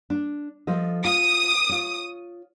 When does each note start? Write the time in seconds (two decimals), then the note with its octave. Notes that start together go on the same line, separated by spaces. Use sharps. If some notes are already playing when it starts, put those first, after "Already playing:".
0.10 D4
0.67 F3 A4 D#5
1.05 F4 D#6
1.69 F4 C#5